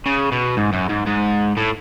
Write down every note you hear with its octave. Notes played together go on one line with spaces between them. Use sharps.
C#3
B2
G#2
F#2
G#2
G#2
A2